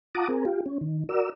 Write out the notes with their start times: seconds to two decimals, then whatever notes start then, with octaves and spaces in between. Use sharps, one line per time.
0.15 F4 F#5 A5 A#5 D6 D#6
0.28 C4 G#4 A#4
0.45 F4 G4
0.66 C#4
0.81 D#3
1.09 F#4 A#4 D5 E6